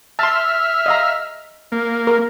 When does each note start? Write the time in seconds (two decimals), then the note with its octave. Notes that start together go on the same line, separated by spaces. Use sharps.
0.19 E5 A5 C6 F6
0.86 D#5 F5 A#5
1.72 A#3
2.07 A#4